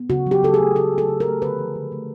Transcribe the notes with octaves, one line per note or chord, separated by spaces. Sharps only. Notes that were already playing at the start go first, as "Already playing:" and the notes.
Already playing: B3
C#3 F#4
F#3 G4
C#3 A4
G#4
A3
C#3 A4
F#3
A4
C#3
A#4
A3
D3 B4
F3
D3
A3